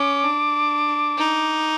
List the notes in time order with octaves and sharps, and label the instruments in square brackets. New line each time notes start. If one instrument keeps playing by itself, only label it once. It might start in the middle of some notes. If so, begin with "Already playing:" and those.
Already playing: [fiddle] C#4 [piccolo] D6
[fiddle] D4
D#4